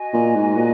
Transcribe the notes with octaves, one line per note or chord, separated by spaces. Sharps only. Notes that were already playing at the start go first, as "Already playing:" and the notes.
Already playing: F#4 D#5 G#5
A#2
G#2
A#2